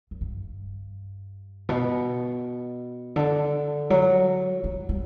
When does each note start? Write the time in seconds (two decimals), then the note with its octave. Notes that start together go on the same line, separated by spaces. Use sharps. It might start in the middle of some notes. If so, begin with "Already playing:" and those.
0.11 F#2
0.21 G2
1.69 B2
3.16 D3
3.90 F#3
4.64 G3
4.89 G3